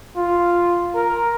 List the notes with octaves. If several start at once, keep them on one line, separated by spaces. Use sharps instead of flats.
F4
A#4